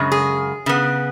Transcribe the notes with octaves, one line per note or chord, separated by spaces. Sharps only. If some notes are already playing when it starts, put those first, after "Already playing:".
Already playing: F#2 C#3 G#3
G#4
C#3 B3